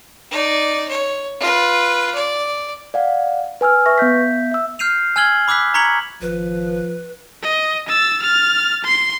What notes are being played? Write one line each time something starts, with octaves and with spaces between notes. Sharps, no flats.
D#4 D5
C#5
F4 B4
D5
D5 F5 F#5
B4 G#5 E6 F6
B4 E5 C#6 A#6
B3 E5 G6 B6
E5 E6
F6 G6 C7 D#7 F7
G#5 E6 F6 G#6 F#7 G7
B5 D6 E6 F#6 B6
A#5 C#6 G#6 B6 C#7 F#7
G#1 F3 B4
D#5
E6 A6
F6 A6
C6 C7